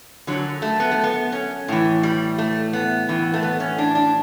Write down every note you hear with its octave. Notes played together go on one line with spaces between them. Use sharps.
F#2 D3 F#3
A3
B3
A3
B3
C#4
A2 E3
G3
A3
B3
A2 E3
A3
B3
C#4
D4
D4